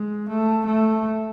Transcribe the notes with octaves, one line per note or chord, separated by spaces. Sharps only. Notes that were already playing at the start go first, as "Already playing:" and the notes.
Already playing: G#3
A3
A3